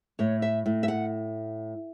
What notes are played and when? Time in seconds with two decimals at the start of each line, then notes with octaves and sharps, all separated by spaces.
0.19 A2 C#5
0.42 E5
0.66 A2
0.83 E5
0.88 F#5